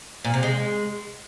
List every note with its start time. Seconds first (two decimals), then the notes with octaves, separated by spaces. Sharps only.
0.25 A#2
0.34 C3
0.43 G#3